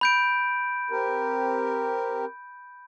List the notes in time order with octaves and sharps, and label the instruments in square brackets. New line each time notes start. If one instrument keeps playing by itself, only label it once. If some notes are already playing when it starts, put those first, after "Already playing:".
[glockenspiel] B5 G6 D7
[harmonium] C4 G4 A#4